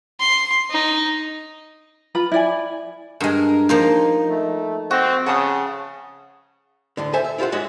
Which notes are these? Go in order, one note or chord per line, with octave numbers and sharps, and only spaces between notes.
C6
D#4
F4 B4 B5
E4 D5 G#5
G2 G#3 A#4
F3 A#3 D#4 F4
A3
C4 F#4
C#3 F#5 A5 D#6
D2 A2 D3
A4 C5 E5 G#5
E5
E4 F4 G4 C5 F#5
G#2 G#3 F#4 C#5 E5